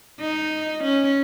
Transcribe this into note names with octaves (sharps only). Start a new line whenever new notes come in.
D#4
C#4